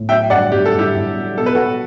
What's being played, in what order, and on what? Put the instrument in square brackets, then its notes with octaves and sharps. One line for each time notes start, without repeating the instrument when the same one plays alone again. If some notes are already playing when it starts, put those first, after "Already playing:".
Already playing: [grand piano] A2
[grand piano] F#3 [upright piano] E5 G5
[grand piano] G2 [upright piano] D5 F#5
[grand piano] G2 [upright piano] G4
[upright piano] A4
[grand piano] G2
[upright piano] E4 G4
[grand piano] G2
F#3
[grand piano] B2 [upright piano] A4
[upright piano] B4
[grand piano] B2 [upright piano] F#4 A4